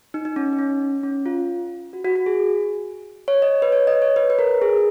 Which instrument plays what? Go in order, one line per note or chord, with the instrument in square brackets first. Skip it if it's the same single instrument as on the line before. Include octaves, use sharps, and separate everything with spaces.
[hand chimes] D#4
D#4
C#4
D#4
C#4
C#4
F4
F#4
F#4
F#4
G#4
C#5
D#5
B4
C#5
D#5
C#5
B4
B4
A#4
G#4